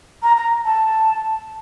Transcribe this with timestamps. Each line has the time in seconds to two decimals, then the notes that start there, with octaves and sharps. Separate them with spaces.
0.23 A#5
0.37 A#5
0.65 A5